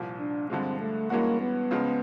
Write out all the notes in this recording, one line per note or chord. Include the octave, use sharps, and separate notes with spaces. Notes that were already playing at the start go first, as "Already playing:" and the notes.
Already playing: C2 A#2 F3
D4
G2 D3 F3 G#3 C4
A3
G2 E3 G#3 A#3 C#4 F#4
B3
C#2 C#3 F3 G#3